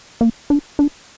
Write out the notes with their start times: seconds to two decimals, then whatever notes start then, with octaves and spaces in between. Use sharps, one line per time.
0.21 A#3
0.50 D4
0.79 D4